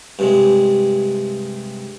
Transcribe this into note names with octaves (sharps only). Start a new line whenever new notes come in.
G2 C3 G#3